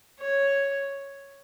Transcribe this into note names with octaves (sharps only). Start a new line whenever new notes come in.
C#5